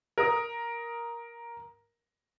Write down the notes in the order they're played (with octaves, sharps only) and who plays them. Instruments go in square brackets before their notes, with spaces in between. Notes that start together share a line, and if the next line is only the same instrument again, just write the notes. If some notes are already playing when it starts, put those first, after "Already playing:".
[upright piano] A#4 D#6